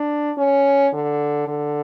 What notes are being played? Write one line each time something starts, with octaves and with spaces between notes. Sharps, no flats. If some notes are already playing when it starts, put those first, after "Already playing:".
Already playing: D4
C#4
D3
D3